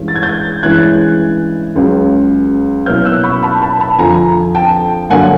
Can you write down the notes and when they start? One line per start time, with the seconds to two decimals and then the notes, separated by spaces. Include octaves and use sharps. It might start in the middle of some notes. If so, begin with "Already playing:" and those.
Already playing: G2 E3 G#3 C#4
0.08 A6
0.15 G#6
0.23 G6 A6
0.63 G2 E3 G#3 C#4 E4 F#6 G#6
1.76 C#2 C#3 F#3
2.86 B2 F#3 A#3 C#4 E4 F6 G6
3.05 E6 F#6
3.24 B5 C#6
3.43 A5 B5
3.61 A5 B5
3.80 A5 B5
3.99 F2 D3 F3 G#5 A#5
4.55 G5 A5
5.10 G2 D3 F#3 A#3 F#5 G#5